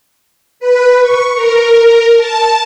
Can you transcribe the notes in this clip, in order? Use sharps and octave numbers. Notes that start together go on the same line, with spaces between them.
B4
C#6
A#4
A5